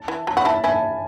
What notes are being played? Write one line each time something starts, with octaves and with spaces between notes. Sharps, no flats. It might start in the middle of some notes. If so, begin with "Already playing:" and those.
Already playing: A5
E3
F#3 A5
F#4 B5
E3 E4 A5
E3 E4 G#5